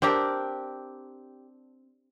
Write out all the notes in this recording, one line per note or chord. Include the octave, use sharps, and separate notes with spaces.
C4 D4 G4 A#4